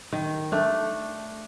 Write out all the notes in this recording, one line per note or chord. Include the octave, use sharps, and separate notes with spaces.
D#3
A3 D4